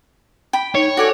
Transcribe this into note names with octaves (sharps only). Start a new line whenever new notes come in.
G5 B5
D#4 C#5
F#4 A4 D5 G#5